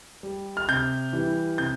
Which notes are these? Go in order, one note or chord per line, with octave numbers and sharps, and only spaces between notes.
G3
F6
C3 G6
E3 G3
C3 G6